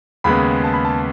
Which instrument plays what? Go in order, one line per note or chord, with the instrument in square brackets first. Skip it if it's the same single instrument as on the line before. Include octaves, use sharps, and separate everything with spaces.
[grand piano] D#2 C#3 G#3 B3 B5
A5
B5
A5